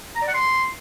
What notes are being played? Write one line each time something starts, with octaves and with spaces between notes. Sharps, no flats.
A#5
D5
F#5
C6